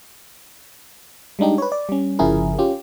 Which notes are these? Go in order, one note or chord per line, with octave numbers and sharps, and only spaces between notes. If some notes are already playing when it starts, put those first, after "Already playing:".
G3 G#3 D4 D#4 G4
B4 C#5
D5
G3 C#4
G1 C#3 F3 E4 G#4 A#4
C#4 F4 G4